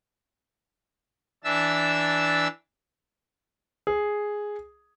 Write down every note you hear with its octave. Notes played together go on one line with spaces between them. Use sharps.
E3 D4 E5 A5 E6
G#4